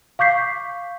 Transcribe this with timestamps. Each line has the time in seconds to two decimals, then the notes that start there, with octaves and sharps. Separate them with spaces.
0.19 F5 C#6 D6 G6 B6 C7